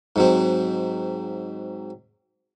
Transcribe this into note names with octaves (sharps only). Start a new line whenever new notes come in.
G#2 F#3 C4